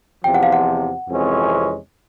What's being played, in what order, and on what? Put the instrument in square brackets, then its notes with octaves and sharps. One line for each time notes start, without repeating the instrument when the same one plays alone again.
[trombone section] E2 C3 F3 [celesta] G5
[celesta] F#5
F5
F#5
[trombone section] F2 C3 E3 G#3 C#4